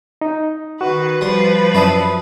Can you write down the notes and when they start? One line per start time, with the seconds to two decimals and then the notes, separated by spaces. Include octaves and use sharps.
0.21 D#4
0.81 D#3 F#4 B4
1.21 F3 G3 B4 C6
1.75 F#2 E4 D5 A5 D#6